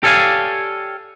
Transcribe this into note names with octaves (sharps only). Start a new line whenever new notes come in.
G4 A4 C#5 D5 F5 G#5